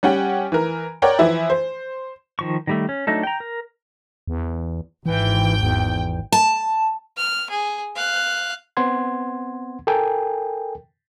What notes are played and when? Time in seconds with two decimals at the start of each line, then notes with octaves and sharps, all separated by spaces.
0.03 G3 C#4 F#5 G5
0.52 E3 A#4
1.02 A#4 C#5 D5 F#5 G5 A#5
1.19 E3 F3 E4
1.50 C5
2.39 D#3 F3 C#6
2.67 D#3 G3 A3
2.89 C#4
3.07 F#3 A3 D4 D#4 A4
3.23 G5 A#5
3.40 A#4
4.28 E2
5.06 G#1 E3 G5
5.61 E2
6.32 A5
7.17 F6
7.50 G#4
7.96 F5 F#6
8.77 B3 C4 F#5 C6 G#6
9.87 A4 A#4 G5 G#5